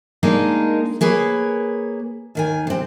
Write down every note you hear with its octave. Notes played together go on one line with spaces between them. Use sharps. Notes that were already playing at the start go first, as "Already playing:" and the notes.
G#3 A#3 D4 D#4 A#4
A#3 G#4 B4 C#5
D#2 D#3 G#5
C3 C4